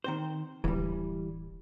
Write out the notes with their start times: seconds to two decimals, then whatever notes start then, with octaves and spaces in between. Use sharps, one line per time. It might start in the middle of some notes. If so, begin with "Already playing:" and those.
0.04 D#3 C4 C5
0.64 D1 E3 G3